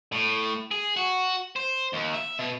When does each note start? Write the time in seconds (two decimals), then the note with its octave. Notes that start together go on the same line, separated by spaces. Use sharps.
0.12 A2
0.71 G#4
0.97 F#4
1.56 C5
1.93 D#2
2.14 E5
2.39 B2